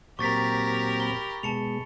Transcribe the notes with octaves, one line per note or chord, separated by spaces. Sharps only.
A#2 F#3 C4 G4 A#4 C#6 A6 B6
B5 G7
B2 G#3 A5 C#7 F7